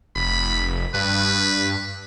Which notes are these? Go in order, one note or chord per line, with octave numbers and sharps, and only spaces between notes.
F1 B5
G2 B4